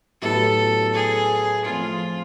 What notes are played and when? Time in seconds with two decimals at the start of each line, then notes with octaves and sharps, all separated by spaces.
0.22 A2 F#3 B3 E4 G4 A4
0.94 G#4
1.65 F3 A3 C4 F4